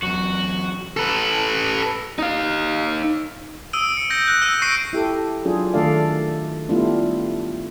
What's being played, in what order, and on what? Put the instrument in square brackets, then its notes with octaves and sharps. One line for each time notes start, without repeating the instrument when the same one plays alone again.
[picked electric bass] E2 F#3 [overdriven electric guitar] F#4
[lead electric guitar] A4 B4
D#4 F5
[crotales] D#6 E6 D7 D#7
C#7
G6 A#6
F#6
E6 D#7
C#6 A#6 C7 D7 D#7
[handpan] E4 G4 A4
F#3 D4 F4 G#4
D#3 A3 D4 A4 D5 F5
G3 A3 B3 D4 E4 F4